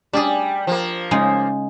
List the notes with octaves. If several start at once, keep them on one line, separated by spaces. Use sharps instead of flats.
G3 D4 G#4
F3 A#3
C#3 G#3 D#4